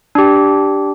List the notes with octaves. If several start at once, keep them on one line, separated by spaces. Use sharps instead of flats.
D4 G4